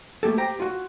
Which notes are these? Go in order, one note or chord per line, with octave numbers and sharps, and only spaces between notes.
A3 A#3 G4 A4
G4 C5 G5 A#5
F4 F#4